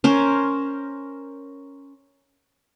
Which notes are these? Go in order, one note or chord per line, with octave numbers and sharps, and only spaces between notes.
C#4 A#4 C5